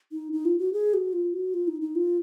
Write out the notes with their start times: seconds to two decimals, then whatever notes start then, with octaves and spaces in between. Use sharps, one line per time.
0.12 D#4
0.32 D#4
0.45 F4
0.59 F#4
0.73 G#4
0.94 F#4
1.13 F4
1.34 F#4
1.54 F4
1.68 D#4
1.81 D#4
1.95 F4